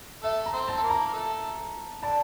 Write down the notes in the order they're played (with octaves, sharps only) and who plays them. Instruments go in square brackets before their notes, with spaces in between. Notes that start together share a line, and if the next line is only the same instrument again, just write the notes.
[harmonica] A3 A4 [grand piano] E5
[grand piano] A#5
[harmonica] C4 C5
[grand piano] A5
[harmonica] A4
A#3 A#4
[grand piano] A#5
[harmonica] A#4
A3 A4
[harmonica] D3 D4 [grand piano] A5